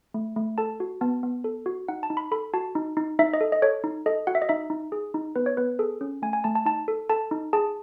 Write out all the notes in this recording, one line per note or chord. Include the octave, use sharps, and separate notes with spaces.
A3
A3
A4 A5
F#4
B3 A5
B3
A4
F#4
D#4 F#5
A5
D#4
B5
A4 B5
F#4 A5
D#4
D#4
D#4 E5
D#5
A4
D#5
A4 C#5
D#4
A4 D#5
F#4 F#5
E5
D#5
D#4 E5
D#4
G#4
D#4
B3 B4
C#5
B3 B4
G#4 A4
C#4
A3 G#5
G#5
A3 A5
A5
D#4 A5
A4
A4 A5
D#4
G#4 A5